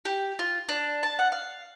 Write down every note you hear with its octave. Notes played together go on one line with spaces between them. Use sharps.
G4
F4
D4
A5
F#5
F5